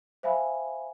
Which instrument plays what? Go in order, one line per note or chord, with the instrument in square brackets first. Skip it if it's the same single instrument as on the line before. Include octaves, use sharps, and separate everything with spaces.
[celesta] C5 E5 F5 G#5 B5